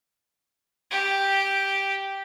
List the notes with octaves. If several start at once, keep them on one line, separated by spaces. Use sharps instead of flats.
G4